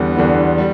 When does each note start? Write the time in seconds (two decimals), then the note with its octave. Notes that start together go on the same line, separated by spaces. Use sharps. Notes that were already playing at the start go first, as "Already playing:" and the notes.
Already playing: E2 D3 G3 B3
0.16 E2 D3 G3 B3
0.58 G3